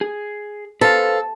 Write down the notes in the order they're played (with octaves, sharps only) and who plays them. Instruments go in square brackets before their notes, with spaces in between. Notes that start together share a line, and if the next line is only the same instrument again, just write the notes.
[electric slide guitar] G#4
[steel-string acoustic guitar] A4 [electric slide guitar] B4 C5 F5